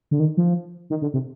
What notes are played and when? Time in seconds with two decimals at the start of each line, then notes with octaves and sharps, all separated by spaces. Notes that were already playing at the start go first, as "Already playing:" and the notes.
0.11 D3
0.20 D#3
0.37 F3
0.90 D#3
1.02 D3
1.14 C3